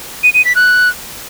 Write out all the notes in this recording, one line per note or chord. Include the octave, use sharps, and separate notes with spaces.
D#7
D#7
B6
F#6